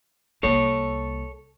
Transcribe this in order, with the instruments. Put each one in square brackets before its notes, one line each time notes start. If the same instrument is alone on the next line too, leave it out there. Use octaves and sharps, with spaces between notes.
[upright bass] C2 A#3 [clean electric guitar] A4 C#5